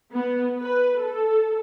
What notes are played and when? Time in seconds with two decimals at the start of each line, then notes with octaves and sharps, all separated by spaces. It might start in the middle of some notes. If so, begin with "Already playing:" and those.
0.11 B3
0.61 B4
1.03 A4